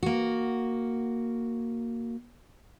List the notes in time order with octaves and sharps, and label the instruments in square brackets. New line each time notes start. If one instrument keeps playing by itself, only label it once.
[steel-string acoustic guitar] A#3 F#4